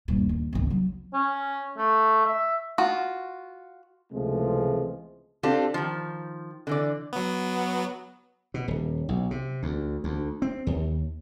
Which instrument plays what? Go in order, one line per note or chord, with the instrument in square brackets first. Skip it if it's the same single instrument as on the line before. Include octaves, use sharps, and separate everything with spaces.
[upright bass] D#1 G2
D#2
G#1 C#2
F#3
[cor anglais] C#4
A3
E5
[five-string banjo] F4 F#4
[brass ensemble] C#2 C3 E3 F3 G#3 A3
[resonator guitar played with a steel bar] C4 D4 F4 G4 A4
D#3 F3
D3 E3 D5
[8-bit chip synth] F#3 B3
[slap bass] B2
D#1
B1
C3
D2
D2
C4
D#2